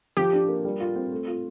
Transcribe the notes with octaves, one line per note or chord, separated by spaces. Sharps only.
F3 G4
D4
A#3
G3
F4
C4
A3
F4